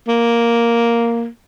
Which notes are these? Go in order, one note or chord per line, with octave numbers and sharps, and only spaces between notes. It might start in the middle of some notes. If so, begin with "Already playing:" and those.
A#3